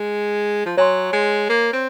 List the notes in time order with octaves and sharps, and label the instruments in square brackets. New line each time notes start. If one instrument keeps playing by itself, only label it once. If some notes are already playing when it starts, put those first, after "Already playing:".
Already playing: [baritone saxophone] G#3
F3
[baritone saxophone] F#3 [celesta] C#5 G#5 C6
[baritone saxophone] G#3
A#3
C4